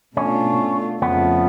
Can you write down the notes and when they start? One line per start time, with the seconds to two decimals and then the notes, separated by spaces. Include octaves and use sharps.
0.16 B2 A3 C#4 D4 F4
1.02 F2 C#3 F3 A3 B3